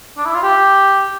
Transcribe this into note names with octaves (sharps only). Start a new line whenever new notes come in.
D4
E4
F4
G4